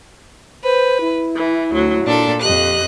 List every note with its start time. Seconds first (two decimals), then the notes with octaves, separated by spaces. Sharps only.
0.64 B4 C5
1.01 E4
1.36 E3
1.71 D2 F#3
2.04 A#2 D4 A4
2.42 F2 G4 D#5 F#6